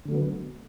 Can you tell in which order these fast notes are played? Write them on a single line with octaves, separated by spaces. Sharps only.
D3 A3 F#3 B3